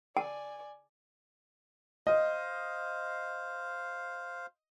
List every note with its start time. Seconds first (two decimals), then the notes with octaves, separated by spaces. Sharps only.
0.17 D5 G#5 A5
2.07 C5 D#5 F5